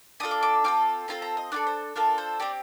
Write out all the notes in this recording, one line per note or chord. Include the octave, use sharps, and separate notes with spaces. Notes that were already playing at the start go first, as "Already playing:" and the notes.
D4 F4 A4 D#6
D6
D6
C4 F4 A4 D6
C4 F4 A4 A#5
A#5
D#5
D4 F4 A4 D5
C5
D4 F4 A4 A#4
C5
C4 G4 D5